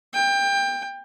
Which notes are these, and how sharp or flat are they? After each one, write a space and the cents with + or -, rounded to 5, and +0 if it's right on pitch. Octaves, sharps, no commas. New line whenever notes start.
G5 +25